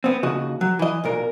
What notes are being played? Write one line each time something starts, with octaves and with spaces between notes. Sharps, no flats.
B3 C4
D#2 C#3 F#4 D#5
F#3
E3 D#5
B1 A#2 A#4